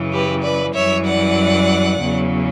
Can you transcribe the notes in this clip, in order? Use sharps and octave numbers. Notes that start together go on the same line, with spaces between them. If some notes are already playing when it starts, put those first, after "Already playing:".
Already playing: F#2 C#3 E3
G4 B4
B4 D5
F#2 E3 G3 C#5 E5
D5 F#5
E2 C#3 F#3